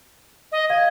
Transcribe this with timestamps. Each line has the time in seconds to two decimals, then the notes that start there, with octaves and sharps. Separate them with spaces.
0.52 D#5
0.70 F5 G#6